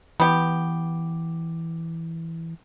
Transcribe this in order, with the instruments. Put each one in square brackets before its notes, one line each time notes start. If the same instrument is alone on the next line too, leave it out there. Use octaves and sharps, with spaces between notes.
[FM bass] E3 [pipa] B3 G4